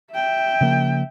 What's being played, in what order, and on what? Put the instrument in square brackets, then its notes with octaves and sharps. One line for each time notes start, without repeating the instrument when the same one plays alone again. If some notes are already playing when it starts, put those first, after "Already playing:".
[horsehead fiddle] E5 G5
[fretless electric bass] C#3 F3 A#3